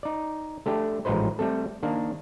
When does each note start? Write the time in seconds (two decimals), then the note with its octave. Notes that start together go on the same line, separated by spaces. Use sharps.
0.03 D#4 D5
0.66 A3 D4 G4
1.05 A1 G#2 F3 D#4 B4 C5
1.39 G3 A3 C4 A4
1.83 D#3 A#3 D4